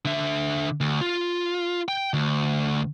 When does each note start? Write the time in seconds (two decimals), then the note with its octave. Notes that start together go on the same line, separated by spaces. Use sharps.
0.05 D3 E5
0.81 D2
1.01 F4
1.88 G5
2.13 D2